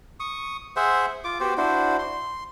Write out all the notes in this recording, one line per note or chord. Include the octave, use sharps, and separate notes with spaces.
C#6 D#6
G#4 C5 E5 F#5
F4 D6
B3 F#4 G4 C5
D4 E4 F#4 C5
C6